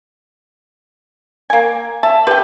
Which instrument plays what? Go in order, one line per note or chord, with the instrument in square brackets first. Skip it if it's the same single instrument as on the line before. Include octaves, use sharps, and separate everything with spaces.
[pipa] A#3 G#5
[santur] E5 [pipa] A5
[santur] G4 [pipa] B4 G5